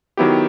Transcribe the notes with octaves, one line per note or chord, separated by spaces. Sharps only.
D#3 F#3 B3 E4 G4